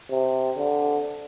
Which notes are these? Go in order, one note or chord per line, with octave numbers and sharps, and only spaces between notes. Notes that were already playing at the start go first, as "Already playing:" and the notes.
C3
D3